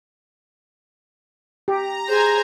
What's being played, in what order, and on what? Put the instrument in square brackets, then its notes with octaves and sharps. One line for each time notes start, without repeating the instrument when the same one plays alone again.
[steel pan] G4 [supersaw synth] A#5
[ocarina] G#4 [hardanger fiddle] C5 G#5